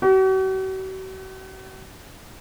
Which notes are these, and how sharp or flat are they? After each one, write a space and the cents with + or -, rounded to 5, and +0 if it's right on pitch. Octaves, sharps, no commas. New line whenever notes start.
F#4 +45